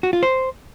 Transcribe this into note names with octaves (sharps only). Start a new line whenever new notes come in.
F#4
F4
C5